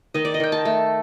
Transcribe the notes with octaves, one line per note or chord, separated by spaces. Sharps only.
D#3 D#5
D5
D#5
D#3 G5
A5
A3